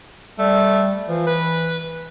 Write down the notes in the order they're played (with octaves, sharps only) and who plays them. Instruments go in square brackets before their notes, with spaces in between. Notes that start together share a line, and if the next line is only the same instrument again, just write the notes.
[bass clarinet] G3 [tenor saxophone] A3
[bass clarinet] E3 [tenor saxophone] F3
[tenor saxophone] B4